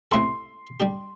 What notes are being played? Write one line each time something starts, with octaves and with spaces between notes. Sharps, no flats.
C3 A3 E4 A4 C6
G3 D4 G4